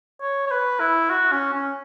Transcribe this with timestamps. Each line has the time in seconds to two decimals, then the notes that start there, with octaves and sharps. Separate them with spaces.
0.22 C#5
0.47 C#5
0.51 B4
0.80 E4
1.10 F#4
1.32 C#4
1.54 C#4